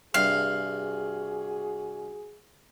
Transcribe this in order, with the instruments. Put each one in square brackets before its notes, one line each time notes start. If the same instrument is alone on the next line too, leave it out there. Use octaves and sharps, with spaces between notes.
[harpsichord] G2 C3 [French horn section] F#4 G#4 [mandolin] F5